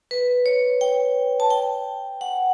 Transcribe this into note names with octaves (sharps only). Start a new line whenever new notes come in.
B4
C#5
G5
A5
G5
F#5